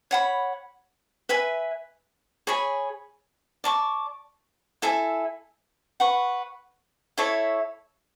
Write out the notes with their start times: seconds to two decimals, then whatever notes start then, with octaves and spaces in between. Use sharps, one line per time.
0.11 C#5 F#5 B5
1.29 B4 E5 G#5
2.47 G#4 C#5 G#5 B5
3.64 D5 A5 C#6
4.82 E4 A4 E5 G#5
6.00 B4 F#5 C#6
7.18 E4 A4 C#5 E5